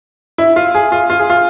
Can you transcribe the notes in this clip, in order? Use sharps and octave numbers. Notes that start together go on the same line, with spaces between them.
E4
F4
G#4
F4
F4
G#4
F4